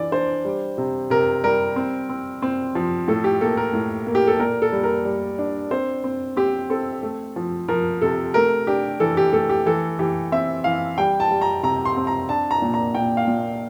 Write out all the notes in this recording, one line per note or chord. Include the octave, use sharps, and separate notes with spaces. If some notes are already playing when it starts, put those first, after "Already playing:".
Already playing: E3 D4 D5
D4 C5
G3
C3
C3 A#4
G3 A#4
C4
C4
C4
F3
A2 A4
G4
A#3 A4
A#4
A2
A#3
G4
A4
A#2 A#4
A4
G3
A#4
G3
D4
C4 C5
C4
C4 G4
C4 A4
A3
F3
F3 A#4
C3 A4
A3 A#4
D4 G4
E3 A4
G4
A3 A4
G4
E3 A4
E3 G4
C4 E5
E3 F5
G3 G5
A5
G3
A#5
C3 A#5
C6
C4
A#5
D4 A5
A#5
A#2
A#5
A#2 G5
F5
A#2